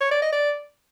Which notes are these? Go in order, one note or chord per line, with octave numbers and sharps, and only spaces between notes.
C#5
D5
D#5
D5